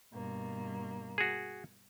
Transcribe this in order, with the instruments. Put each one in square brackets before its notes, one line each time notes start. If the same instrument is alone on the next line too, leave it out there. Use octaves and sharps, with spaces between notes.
[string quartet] G2 B2 A#3
[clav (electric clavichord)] F#4 G#4